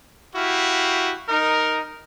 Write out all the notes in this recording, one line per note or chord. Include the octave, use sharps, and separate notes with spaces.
E4 F#4 G4 F5
D#4 A#4